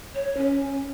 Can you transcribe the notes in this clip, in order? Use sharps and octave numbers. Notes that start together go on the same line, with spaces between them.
C#5
C#4